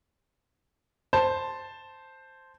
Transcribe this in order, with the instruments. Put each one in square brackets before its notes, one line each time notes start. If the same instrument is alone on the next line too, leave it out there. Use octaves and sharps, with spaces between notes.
[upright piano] C5 A5